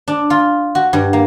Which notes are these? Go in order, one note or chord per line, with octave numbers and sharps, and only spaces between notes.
D4
F4
F#4
G2
A#3